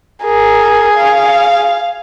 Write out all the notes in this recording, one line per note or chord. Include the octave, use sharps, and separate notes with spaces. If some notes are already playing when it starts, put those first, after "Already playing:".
G#4 A#4
F5